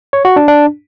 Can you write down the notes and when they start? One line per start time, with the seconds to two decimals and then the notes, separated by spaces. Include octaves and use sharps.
0.13 C#5
0.25 F#4
0.36 D4
0.48 D4